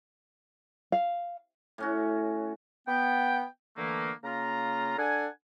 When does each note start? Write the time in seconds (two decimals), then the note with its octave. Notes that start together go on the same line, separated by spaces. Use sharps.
0.92 F5
1.78 A2 C#4 F#4
2.87 B3 G5
3.77 D3 E3 A3 A#3
4.24 C#3 A#3 F4 A#5
4.98 D4 A4 F#5 G#5